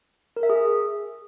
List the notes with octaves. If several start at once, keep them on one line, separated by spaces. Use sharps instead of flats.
A#4
E5
G#4